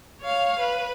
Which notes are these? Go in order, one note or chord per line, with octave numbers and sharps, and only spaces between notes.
C#5 F5
B4